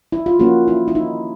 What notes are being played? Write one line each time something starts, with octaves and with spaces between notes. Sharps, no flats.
E4
F4
F3 A#3 C#4 F#4
E4
E4
D#4